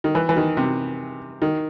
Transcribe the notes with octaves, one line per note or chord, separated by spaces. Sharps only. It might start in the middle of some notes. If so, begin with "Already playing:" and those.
D#3
E3
E3
D#3
C3
D#3